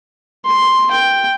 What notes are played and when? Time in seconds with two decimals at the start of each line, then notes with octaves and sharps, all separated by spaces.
0.46 C6
0.91 G5